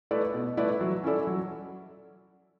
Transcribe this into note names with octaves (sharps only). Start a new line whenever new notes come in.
A3 E4 B4 D5
B2
A3 E4 B4 D5
F#3
C#4 E4 A4 D5
F#3